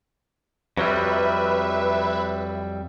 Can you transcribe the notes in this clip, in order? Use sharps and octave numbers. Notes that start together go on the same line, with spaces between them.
F2 F#3 G3 B4 E5